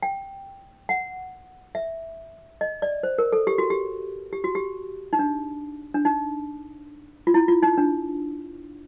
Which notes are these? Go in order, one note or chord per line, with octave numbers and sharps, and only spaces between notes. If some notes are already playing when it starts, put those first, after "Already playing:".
G5
F#5
E5
D#5
D5
C5
A#4
A4
G4
F#4
G4
G4
F#4
G4
D#4
D4
D4
D#4
F4
E4
F4
D#4
D4